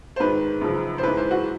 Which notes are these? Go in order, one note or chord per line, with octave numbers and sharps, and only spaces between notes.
C5
G#2 D#3 B4
F#2 C#3 F3
C5
G#2 E3 B4
C5
F#4